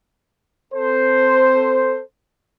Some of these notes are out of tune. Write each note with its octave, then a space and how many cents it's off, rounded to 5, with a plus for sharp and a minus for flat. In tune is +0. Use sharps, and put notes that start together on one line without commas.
C4 -10 A4 +10 C5 +0